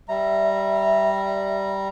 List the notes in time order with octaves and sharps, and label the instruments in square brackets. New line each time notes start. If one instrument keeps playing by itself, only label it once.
[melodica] G3 A#5 [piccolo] E5